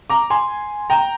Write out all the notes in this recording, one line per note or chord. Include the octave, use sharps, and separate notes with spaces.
A#5 D6
G#5 C6
G5 A#5